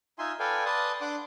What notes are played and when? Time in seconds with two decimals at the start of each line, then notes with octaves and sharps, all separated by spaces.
0.19 D#4 F4 E5 G#5 C6
0.39 A4 B4 D5 F5 G5 G#5
0.66 B4 D5 A5 C6 D#6
1.01 D4 F#5 C6 D6